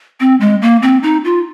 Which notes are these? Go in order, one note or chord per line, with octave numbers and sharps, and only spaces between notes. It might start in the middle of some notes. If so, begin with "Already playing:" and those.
C4
G#3
A#3
C4
D#4
F4